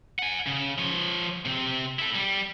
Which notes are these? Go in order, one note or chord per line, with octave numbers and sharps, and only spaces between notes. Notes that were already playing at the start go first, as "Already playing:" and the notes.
F#5 G#5
C#3
F3 C#5
C3 C4
E4 A4
G3